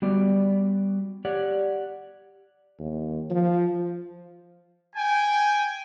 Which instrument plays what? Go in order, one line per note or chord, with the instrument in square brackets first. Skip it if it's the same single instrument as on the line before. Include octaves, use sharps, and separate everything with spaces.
[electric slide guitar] G3 B3 F#4 D5
G4 C#5 D5 F#5
[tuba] D#2
F3
[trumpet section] G5 G#5